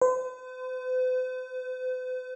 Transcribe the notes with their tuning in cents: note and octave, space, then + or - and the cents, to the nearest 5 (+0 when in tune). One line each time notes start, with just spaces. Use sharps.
C5 -45